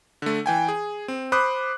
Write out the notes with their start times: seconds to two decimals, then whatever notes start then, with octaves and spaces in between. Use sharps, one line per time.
0.22 D3 A3
0.46 E3 G5 G#5
0.68 G#4
1.08 C4
1.32 C5 B5 D6 D#6 F#6